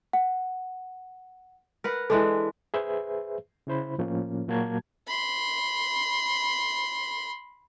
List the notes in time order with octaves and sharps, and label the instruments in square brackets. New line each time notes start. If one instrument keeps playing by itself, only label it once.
[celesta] F#5
[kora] A#4 B4 F#5
[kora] E3 G#3 D4 [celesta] A4
[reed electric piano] G#4 B4 C5 E5
C#3 E4 C5 B5
A2 F3 A#3 C#4
A#2 F#3 A#3 F#4 A5 G#6
[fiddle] B5 C6